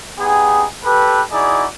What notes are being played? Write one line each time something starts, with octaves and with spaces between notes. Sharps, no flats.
B3 D#4 G4 G#4
G4 A4 B4
D#4 E4 F#4 G#4 D5